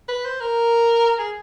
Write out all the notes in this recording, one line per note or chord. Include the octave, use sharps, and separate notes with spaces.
B4
C5
A#4
G#4